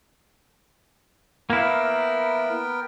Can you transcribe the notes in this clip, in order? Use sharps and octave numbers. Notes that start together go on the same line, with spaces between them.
A#3 B3 E4 A#4 G5